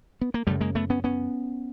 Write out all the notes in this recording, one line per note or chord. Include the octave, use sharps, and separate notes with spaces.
B3
A#3
F#2 C#3 G3 A3
G#3 A#3
A3 B3
B3 C#4
B3 C#4